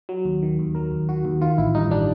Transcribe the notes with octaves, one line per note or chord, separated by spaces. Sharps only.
F#3
D#2
D#3
D#2
F#3 A#4
D#2
D#3 F#4
D#2
D#3 F4
A1 E4
G2 D#4
G3 D4